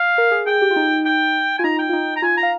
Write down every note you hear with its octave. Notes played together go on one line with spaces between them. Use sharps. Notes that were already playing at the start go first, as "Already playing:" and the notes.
Already playing: F5
A#4
G#4
G#4 G5
G4
F4
D#4
G5
F4 G#5
D#4 A#5
G5
F4
D#4
A#5
F4 G#5
A#5
F5